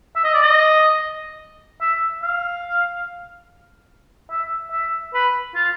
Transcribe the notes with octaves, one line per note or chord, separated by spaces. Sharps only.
E5
D#5
D5
D#5
E5
F5
E5
E5
B4
F4